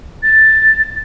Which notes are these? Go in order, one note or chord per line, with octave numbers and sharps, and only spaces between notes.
A6